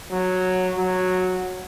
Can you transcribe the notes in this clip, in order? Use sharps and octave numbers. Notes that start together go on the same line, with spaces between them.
F#3
F#3